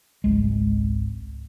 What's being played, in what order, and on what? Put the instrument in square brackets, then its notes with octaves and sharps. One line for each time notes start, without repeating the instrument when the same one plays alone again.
[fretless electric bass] G#1 C#2 G#3